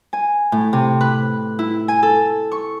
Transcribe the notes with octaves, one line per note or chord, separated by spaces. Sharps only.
G#5
A2
C3
B4
E4
G#5
A4
C#6